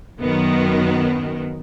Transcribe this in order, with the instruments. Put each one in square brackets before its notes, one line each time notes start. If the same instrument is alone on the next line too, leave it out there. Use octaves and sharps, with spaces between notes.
[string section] F#2 D#3 B3